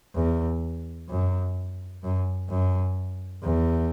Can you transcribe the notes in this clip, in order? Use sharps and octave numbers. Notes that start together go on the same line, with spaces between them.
E2
F#2
F#2
F#2
E2